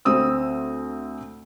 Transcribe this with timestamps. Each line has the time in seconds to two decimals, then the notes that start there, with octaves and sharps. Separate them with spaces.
0.05 D2 C4 D#6 E6